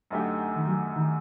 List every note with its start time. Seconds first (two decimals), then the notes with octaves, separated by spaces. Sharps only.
0.11 F#2 D3 A3 D#4 G4
0.56 D#3
0.68 F#3
0.96 D#3